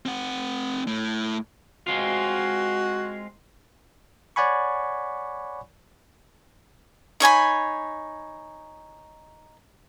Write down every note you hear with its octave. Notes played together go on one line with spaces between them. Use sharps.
C4 F#5
A2
G#3 C4 F4 F#4
C#5 D5 F#5 G#5 B5 C#6
D#4 C#5 G#5 B5